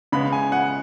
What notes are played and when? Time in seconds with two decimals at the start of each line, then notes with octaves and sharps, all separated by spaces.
0.12 C#3 G#3 B3 B5
0.33 G#5
0.52 F#5